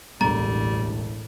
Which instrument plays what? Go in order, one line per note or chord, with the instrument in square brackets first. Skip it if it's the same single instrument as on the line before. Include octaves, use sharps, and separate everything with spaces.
[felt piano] E1 D2 [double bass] A1 A2 [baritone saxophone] G3 [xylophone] A#5